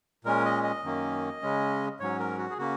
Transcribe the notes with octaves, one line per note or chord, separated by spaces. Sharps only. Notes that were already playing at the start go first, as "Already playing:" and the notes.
A#2 G#3 C#4 A#4
D#5
D#5
F#2 D#3 A#3 C#4
C#3 G#3 C#4
G#2 F#3 C#4 C#5
A#4
F#4
G#4
C#3 A#3 C#4 F#4